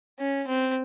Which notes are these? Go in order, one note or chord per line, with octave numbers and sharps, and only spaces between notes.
C#4
C4